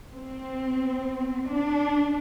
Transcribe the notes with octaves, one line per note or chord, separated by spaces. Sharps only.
C4
D4